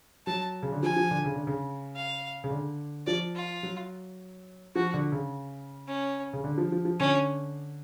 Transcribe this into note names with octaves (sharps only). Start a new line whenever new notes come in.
F#3 A5
C#3
D3
F3 G#5
F3
D3
C#3
D3
C#3
F5
C#3
D3
F3 D5
F4
F#3
F3 F#4
D3
C#3
C#4
C#3
D3
F3
F3
F3
D3 C#4